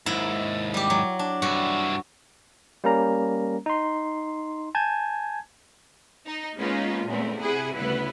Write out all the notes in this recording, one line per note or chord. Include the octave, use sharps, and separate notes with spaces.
D#2 G#2 E4
G3 G4
F#3
D4
G2 E4 F#4
G3 A#3 C#4 A#4 A#5
D#4 C6
G#5 A5 G6 G#6
D#4
G#3 A#3 B3 C#4 D#4 F4
E2 A#2 C#3 G#3 A3 C4
C3 E4 G#4 F#5 G#5
D2 C#3 G3 B3 E4 B4